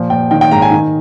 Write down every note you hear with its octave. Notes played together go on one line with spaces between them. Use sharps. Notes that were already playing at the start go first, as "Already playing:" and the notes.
Already playing: A#2 F3
A#2 G5
D#3 G5
G5
G#2 A#5
G#5
D#3